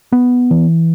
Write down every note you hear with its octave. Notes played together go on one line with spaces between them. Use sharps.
B3
E3